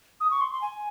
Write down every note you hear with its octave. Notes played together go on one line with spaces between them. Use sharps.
D#6
C#6
C6
C6
G#5